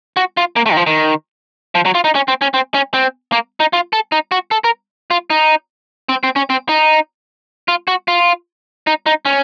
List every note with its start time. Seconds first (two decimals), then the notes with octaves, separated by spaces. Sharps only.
0.17 F#4
0.37 F4
0.56 A#3
0.66 A3
0.72 D#3
0.77 F3
0.87 D#3
1.75 F3
1.85 F#3
1.95 F4
2.04 D#4
2.15 C#4
2.28 C4
2.41 C#4
2.54 C4
2.74 C#4
2.94 C4
3.32 A#3
3.60 D#4
3.73 F4
3.93 A4
4.12 D#4
4.32 F#4
4.51 A4
4.64 A#4
5.11 F4
5.30 D#4
6.09 C4
6.23 C4
6.36 C#4
6.50 C4
6.69 D#4
7.68 F4
7.88 F#4
8.08 F4
8.87 D#4
9.06 D#4
9.25 C#4